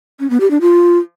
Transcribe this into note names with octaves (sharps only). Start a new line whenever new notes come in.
C#4
B3
G4
D4
F4